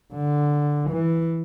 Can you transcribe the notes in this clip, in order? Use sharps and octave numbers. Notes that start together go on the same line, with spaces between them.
D3
E3